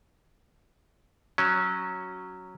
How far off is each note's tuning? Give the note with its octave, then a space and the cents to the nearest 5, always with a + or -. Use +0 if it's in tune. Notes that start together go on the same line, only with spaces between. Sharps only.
F#3 +0 C#4 +0